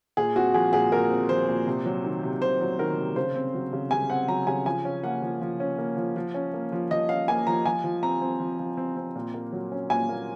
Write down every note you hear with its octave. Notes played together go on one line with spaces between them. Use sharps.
A#2 G#4
C4 F#4
F3 G#4
A#2 G#4
A#2 A#4
C4
F3 C5
A#2
C3
F#3
D#3
C3
C3 C5
F#3
D#3 A#4
C3
C#3 C5
C4
F#3
C#3
C#3 G#5
C4 F#5
F#3 A#5
C#3 G#5
F3 G#5
C#4
A#3 F#5
F3
F3
C#4
A#3
F3
F3
C#4
A#3
F3
F3 D#5
C#4 F5
A#3 G#5
F3 A#5
F3 G#5
F3
C4 A#5
C4
F3
F3
C4
C4
A#2
A#3
F#3
C#4
A#2 G#5
A#3